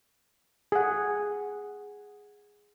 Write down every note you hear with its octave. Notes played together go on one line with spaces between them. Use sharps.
G#4 F#5